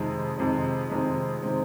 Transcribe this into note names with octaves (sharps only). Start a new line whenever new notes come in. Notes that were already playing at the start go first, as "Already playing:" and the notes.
Already playing: F2 C3 D#3 G#3 C4
F2 C3 D#3 G#3 C4
F2 C3 D#3 G#3 C4
C3 D#3 G#3 C4